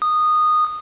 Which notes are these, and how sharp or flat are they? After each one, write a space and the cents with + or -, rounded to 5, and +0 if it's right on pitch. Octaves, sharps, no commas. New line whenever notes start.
D#6 -15